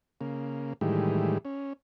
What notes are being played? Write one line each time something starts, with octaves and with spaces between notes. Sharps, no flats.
C#3 A#3
A2 D#3 E3 G3 G#3
C#4